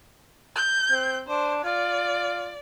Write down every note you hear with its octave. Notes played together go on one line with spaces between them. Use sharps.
G6
C4
D4 C5
F4 D5